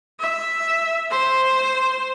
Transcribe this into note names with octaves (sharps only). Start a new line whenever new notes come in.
E5
C5